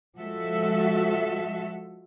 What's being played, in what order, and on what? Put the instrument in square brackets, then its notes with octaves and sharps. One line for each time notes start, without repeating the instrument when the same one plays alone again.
[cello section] F3 G#3 F#4 A4 E5